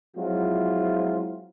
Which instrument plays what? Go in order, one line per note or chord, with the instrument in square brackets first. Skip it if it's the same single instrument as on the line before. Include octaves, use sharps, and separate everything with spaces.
[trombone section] F3 F#3 G#3 C4 E4 F4